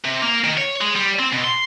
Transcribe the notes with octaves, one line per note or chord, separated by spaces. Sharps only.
C3
A#3
D#3
C#5
G#3
G3
C4
B2
C6